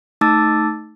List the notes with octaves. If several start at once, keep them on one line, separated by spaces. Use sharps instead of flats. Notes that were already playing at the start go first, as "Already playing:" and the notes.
A3 D#4 A5 D6 E6 A6